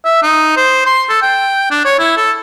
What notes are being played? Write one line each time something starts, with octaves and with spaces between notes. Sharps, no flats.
E5
D#4
C5
C6
A4
G5
D4
C#5
E4
A4